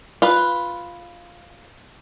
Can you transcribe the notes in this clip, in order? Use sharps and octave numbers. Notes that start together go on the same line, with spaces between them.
F4 B4